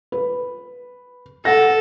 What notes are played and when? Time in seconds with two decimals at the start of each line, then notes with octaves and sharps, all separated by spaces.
0.12 B4
1.45 A4 F#5 A#6